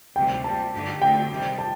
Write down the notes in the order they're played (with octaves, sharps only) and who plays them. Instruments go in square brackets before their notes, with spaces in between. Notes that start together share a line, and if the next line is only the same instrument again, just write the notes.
[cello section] D2 C3 D#3 G3 [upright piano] G5
[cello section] C3 G3 A#3 [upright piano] A5
[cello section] G2 D3 A3 D#4 G4
[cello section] D2 D3 A3 C4 [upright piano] G5
[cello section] C3 D#3 G3
[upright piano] A5